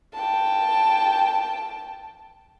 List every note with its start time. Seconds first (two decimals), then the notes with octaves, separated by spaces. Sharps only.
0.13 G5 A5